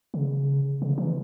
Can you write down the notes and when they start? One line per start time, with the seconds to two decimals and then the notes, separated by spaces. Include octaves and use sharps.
0.14 C#3
0.82 C#3
0.98 E3